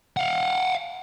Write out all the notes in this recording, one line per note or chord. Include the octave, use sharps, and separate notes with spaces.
F5 F#5